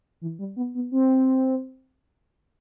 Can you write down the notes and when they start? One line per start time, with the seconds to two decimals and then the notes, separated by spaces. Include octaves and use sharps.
0.21 E3
0.39 G3
0.56 B3
0.75 B3
0.92 C4